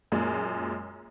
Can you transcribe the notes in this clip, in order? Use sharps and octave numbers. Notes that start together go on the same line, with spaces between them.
F#2 A#2 G#3